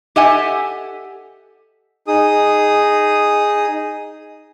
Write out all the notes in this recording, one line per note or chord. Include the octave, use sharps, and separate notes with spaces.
G4 A4 D#5 E5 F#5 G#5
D#4 G#4 D#6